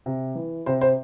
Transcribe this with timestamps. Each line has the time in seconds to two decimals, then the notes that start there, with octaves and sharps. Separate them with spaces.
0.06 C3
0.35 E3
0.66 C3 C5
0.81 C5